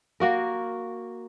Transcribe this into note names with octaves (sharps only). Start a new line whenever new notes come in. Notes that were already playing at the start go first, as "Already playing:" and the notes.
A#3 F#4 A#4